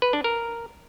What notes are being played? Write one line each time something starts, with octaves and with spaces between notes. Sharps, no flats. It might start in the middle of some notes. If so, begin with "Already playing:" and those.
B4
D4
A#4